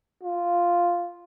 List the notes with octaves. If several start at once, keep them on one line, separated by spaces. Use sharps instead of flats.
F4